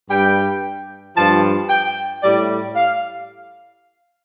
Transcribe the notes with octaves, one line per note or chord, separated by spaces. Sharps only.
G2 G3 G5
G2 F3 A5
G5
A2 G3 D5
F5